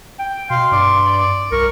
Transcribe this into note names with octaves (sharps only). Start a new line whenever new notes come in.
G5
B2 F5 C6
G2 D5
D5
C2 A#4 C#6